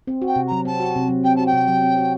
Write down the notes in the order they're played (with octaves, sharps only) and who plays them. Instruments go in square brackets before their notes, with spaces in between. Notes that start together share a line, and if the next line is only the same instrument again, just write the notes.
[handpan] C4
F#4
[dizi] G5
[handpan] C3
[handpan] F#3 [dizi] A#5
[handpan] C4 [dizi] A5
[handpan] F#4
C3
F#3
[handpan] C4 [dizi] G5
[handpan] F#4 [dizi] A5
[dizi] G5
[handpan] C3
F#3
C4
F#4